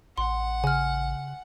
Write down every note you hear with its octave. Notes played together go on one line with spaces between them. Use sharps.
A1 F#5 C6
C#3 G#5 F6